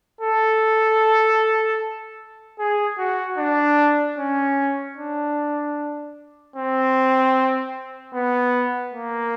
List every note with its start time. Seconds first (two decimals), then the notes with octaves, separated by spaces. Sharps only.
0.21 A4
2.59 G#4
2.99 F#4
3.38 D4
4.18 C#4
4.97 D4
6.56 C4
8.14 B3
8.94 A#3